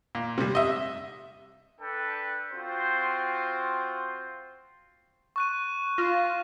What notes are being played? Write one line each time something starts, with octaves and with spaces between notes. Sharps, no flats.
A#2
C3 G3
D#5 E5
D4 A4 B4 G5 A5
C4 F4 F#4 C5
C#6 F#6 D#7
F4 A#6